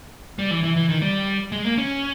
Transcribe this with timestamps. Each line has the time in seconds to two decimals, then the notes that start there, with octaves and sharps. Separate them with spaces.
0.39 G3
0.51 E3
0.64 E3
0.76 E3
0.89 D#3
1.02 G3
1.52 G#3
1.65 A#3
1.78 C#4